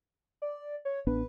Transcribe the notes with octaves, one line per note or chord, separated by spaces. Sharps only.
D5
C#5
A1 B3 D4 B4